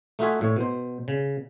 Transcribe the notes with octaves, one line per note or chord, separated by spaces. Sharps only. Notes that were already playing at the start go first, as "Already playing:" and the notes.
A3 D#4 F4 F#4 E5 G#5
A2 C#5
B2 C5
C#3